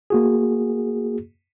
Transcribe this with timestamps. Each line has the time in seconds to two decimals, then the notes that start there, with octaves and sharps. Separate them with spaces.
0.10 A#3 F#4 G#4